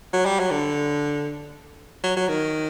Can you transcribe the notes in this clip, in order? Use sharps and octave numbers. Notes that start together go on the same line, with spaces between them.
F#3
G3
F#3
D3
F#3
F#3
D#3